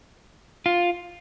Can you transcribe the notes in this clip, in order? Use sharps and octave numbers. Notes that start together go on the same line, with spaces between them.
F4